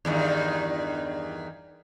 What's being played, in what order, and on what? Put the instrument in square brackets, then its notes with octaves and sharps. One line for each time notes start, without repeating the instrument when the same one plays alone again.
[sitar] E2 G2 D#3